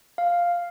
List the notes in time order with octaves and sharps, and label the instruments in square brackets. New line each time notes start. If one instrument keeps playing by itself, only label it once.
[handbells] F5